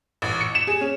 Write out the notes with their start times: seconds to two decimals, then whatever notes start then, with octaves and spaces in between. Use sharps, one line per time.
0.22 A1
0.41 C#7
0.55 E7
0.67 G#4
0.81 C#4